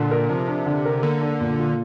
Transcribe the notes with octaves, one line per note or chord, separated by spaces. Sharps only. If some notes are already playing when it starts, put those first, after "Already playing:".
Already playing: A#2 D3
A#4
C3 F3
D4
D3
A#4
D3 A#3
D4
A#2
F4